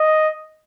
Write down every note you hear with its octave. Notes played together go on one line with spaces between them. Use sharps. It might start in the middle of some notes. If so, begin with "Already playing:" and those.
Already playing: D#5